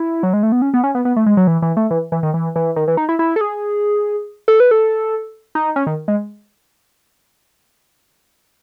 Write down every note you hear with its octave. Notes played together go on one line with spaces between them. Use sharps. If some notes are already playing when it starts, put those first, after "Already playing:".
Already playing: E4
F#3
G#3
A3
B3
C#4
B3
C#4
B3
B3
A3
G#3
F#3
E3
E3
A3
E3
E3
D#3
E3
E3
D#3
E3
D#4
E4
E4
A4
G#4
A4
B4
A4
D#4
C#4
D#3
G#3